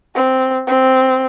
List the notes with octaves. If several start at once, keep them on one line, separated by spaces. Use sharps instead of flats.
C4
C4